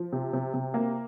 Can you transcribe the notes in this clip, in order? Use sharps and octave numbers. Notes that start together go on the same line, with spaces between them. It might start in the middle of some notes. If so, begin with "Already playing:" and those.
Already playing: F3
C3
C3
C3
A#3